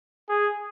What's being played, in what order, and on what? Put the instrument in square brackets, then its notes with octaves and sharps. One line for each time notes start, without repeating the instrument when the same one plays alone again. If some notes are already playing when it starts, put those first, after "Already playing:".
[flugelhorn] G#4